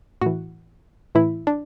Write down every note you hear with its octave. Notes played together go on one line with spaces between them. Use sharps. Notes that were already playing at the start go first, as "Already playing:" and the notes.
A2 E3 F#4
A2 E3 E4
D4